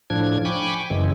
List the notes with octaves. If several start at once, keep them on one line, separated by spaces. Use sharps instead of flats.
A2 F3 D4 G#6
G5 G#5 B5 C#6 D6
F#2 C#3 E3 G#3